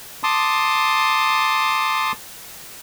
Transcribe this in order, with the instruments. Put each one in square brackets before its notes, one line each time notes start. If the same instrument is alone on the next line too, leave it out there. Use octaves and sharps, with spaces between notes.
[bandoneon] A5 C6 D6 D#6